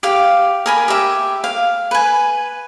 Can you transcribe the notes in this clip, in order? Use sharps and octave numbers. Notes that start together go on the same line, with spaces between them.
G4 F5
A#4 G#5 B5
G4 E5
F5
B4 G#5